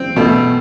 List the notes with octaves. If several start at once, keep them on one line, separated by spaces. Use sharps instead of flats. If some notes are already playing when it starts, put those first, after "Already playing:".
Already playing: C4
B2 A3